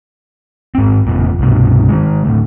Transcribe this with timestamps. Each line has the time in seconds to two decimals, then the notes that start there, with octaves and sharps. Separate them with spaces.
0.75 G#2 C4
1.07 F#1 F2 A#2
1.39 C2 G2 B2
1.88 D#3 E3 G#3
2.25 D2 A2